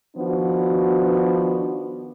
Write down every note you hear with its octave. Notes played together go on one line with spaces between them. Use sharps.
D#3 F3 B3 D4 F#4